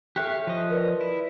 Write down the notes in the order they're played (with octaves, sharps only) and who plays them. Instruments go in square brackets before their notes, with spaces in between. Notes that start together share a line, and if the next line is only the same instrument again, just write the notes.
[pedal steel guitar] G4 C#5 F5 [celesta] A4 E5 F#6
[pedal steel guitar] F3 D#5
[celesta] A#4 B4 D5
[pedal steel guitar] E4